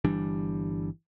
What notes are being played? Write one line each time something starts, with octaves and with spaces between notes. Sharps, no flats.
G1 E3 G3 D4